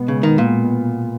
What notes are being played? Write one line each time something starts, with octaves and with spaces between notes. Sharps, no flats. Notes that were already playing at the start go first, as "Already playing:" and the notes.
Already playing: B2 G#3 B3
C#3
D#3
A#2